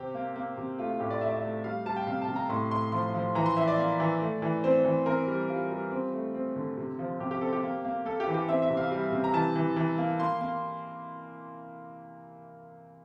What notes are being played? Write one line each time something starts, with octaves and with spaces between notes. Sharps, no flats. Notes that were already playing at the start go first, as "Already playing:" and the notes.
Already playing: C3 C4 G4
A#3
A#3
C3
A3 F4
F4
A2 G4
D5
A3 E5
D5
E5
A3
G3 F5
G3 A5
G5
C3 F5
A5
C3
A#5
A2 C6
A2 C6
F3 C6
F3
E3 A#5
C6
E3 E5
D5
A#3
E3
A3
E3
C4 C5
E3
C4 A#4
G3
G3 F4
G3
C4
A3
C4
D3
C3
F3
C3 G4
G4
C4 A4
G4
A#3
A#3
A#3 A4
G4
E3
G4
C4 E5
E5
C3
F5
G3
C3
A#5
E3 A5
E3
E3
A#3
A#3 C6
A#3